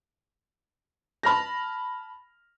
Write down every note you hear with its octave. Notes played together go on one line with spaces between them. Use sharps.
A5 B5 F6 A#6